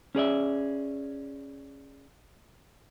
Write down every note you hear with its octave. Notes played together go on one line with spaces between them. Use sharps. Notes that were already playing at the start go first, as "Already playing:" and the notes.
C#4 G#4 D5 E5